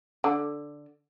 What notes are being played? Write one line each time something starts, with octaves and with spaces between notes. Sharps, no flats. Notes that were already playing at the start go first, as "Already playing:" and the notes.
D3